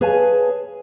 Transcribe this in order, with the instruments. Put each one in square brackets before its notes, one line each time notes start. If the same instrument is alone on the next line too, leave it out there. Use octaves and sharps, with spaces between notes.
[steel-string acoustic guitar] G#4 B4 C#5 F5 G#5 A5